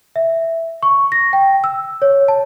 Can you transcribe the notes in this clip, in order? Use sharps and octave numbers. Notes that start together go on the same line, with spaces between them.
E5
C#6
A#6
G5
E6
C#5
A5